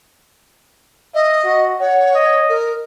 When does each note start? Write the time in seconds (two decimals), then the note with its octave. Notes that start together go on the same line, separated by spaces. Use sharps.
1.15 D#5 E5
1.44 F#4
1.80 C#5 F#5
2.15 D#5
2.49 A#4